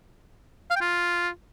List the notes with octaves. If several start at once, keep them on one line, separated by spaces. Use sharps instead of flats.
F5
G5
F4